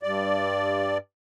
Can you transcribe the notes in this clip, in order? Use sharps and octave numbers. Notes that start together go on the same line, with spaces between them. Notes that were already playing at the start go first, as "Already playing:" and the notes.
G2 D5